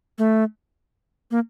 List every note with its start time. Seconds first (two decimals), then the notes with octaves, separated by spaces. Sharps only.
0.18 A3
1.31 A#3